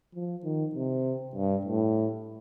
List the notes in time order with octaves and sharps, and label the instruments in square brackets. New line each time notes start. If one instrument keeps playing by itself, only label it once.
[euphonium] F3
D#3
C3
G2
A2